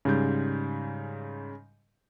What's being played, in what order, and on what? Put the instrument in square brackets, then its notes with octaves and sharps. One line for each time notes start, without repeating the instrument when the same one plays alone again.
[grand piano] G#2 G3 G6 [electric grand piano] C#3